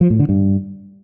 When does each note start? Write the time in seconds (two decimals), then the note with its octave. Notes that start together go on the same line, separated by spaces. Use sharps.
0.01 F3
0.10 A2
0.19 D3
0.29 G2